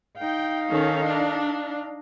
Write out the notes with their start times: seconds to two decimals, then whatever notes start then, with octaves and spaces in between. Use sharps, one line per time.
0.18 D#4 F5 G5
0.67 D#3 C#4 A4
1.04 D4